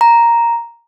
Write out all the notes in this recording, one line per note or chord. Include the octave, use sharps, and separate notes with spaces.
A#5